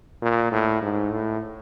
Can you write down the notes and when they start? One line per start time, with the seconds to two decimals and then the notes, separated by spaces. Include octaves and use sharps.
0.22 A#2
0.52 A2
0.82 G#2
1.11 A2